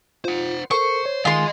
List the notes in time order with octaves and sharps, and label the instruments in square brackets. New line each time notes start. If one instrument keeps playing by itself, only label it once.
[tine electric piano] F4 [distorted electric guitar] C5 F#5
[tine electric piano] A4 A#4 [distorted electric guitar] C5 [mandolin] C#6
[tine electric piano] C#5
[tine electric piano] D#3 G#5 [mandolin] F4 C6 [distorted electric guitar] G#4 D#5